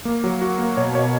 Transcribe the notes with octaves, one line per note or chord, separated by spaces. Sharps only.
A#3
F#3
F#4
A#3
B2 C#5
C#5